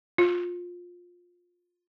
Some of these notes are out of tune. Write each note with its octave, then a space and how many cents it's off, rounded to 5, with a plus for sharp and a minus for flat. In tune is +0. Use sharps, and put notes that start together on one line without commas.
F4 +20